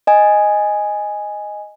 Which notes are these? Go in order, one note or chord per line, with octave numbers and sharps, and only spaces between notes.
D#5 G#5